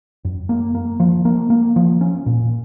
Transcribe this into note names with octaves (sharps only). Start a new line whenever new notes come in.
F#2
A#3
A#3
F3
A#3
A#3
F3
C#4
A#2